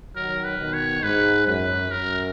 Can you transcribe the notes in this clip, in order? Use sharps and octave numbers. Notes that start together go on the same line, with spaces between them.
D#3 F#3 A#4
B4
B2 D#3
C#5
G#2 B4
F#2 B4
F#2 A#4